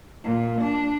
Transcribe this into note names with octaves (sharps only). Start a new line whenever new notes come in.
A#2
D4